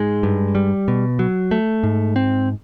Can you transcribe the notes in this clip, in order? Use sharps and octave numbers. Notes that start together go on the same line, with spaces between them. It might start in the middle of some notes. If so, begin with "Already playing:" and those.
Already playing: G#2 G#3
G2
G3
B2
F#3
A3
G#2
C4